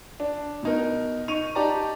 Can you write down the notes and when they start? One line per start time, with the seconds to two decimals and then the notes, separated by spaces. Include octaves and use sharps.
0.20 D4
0.63 B2 D#4 A#4
1.28 D#4 C#6 D#7 F7
1.55 D#4 G4 D5 A5 A#5